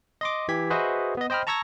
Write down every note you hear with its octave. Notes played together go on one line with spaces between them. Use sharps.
D#5 C6 D6
E3 G4 G#6 B6
F#4 G#4 B4 C5 D#5 E5
B3 D#5
C5 D#5 G5 B5 F6
A5 A#5 C#6 E6 G#6 A#6